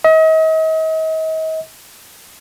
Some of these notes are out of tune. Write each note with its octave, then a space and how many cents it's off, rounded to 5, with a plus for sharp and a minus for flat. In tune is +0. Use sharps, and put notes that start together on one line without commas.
D#5 +40